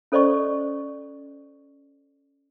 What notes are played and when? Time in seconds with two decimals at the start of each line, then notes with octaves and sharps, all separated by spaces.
0.12 C#4 A4 C5 D5 D#5 C#6